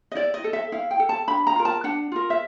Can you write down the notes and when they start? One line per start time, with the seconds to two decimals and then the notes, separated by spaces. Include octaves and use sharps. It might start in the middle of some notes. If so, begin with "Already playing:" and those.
0.12 D#5
0.15 E4 D5
0.34 D#5
0.44 A4
0.53 E5
0.72 E4 F5
0.91 G5
1.00 A4
1.09 A5
1.28 D4 B5
1.47 A#5
1.56 F4 A#4
1.65 A5
1.84 D4 F#5
2.12 F4 A#4
2.30 E5